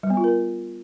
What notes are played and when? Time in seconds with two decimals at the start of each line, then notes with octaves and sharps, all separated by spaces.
0.03 G3
0.10 B3
0.17 F4
0.24 A#4